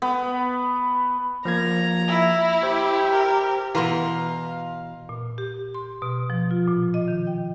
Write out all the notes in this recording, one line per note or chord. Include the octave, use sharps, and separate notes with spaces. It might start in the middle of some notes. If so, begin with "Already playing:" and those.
B3
F3 A#3 A#5 G#6
E4
G4 C5
A#4
B2 E3 E4 F5 A#5 C6
A#2
G4
C6
B2
F3
F4
A#2
D#5
D#3
G5